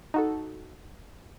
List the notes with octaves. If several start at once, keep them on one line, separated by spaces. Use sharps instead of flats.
D#4 F#4 A4